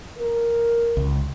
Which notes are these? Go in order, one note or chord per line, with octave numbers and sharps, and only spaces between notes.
A#4
C#2